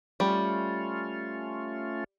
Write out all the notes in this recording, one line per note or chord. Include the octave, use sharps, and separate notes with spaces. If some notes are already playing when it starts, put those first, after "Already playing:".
G3 A3 C#4 F4